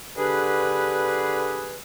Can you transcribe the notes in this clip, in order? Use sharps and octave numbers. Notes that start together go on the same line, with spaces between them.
D3 G4 G#4 B4